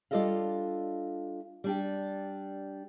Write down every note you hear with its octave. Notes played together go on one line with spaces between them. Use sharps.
G3 D4 F4 A4 D#5 F5
G3 D4 G4